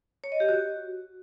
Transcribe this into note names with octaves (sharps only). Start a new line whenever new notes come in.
C#5
D#5
G4
F#4